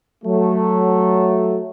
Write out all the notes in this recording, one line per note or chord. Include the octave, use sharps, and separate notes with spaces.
F#3 A3